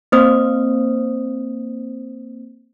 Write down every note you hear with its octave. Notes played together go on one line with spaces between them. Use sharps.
A#3 C4 C5 D#6